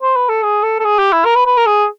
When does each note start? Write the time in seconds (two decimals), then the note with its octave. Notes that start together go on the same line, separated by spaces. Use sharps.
0.02 C5
0.16 B4
0.29 A4
0.43 G#4
0.63 A4
0.79 A4
0.84 G#4
0.99 G4
1.12 E4
1.25 A#4
1.35 B4
1.46 B4
1.57 A#4
1.66 G#4